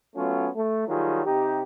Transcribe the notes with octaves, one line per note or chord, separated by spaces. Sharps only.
F#3 A3 B3 C#4 F4
A3
D#3 F#3 G3 F4 G#4
C3 D#4 G4